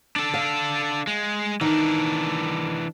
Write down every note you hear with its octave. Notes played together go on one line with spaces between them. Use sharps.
D4 A4
F5
G#3
D#3 E3 D4